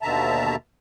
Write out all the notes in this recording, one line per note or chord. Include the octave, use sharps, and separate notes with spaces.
D#2 B2 D3 E5 A5 A#5